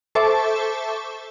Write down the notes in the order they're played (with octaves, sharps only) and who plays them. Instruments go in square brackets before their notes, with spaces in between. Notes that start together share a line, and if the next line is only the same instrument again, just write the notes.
[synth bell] A4 C5 E5 A5 C#6 D6